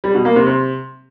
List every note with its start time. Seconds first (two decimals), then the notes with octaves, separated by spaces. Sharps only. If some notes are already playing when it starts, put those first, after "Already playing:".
0.04 G3
0.14 B2
0.25 A#3
0.36 C3
0.46 C3